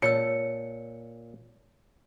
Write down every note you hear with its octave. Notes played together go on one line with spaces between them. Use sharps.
A#2 C#5 D#5 A5 E6 C#7